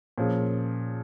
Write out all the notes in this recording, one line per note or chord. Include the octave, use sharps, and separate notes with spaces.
A#2 F3 C#4 G#4